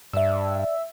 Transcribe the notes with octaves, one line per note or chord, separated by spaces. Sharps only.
G2 D5 E5 E6